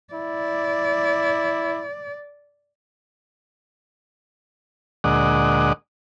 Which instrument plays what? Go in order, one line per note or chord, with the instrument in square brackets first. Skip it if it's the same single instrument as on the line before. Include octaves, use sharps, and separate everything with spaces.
[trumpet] E4 [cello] D5
[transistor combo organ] D2 A#2 G#3 D5 D#5 F#5